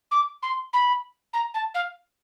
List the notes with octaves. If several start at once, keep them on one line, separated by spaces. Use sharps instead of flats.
D6
C6
B5
A#5
A5
F5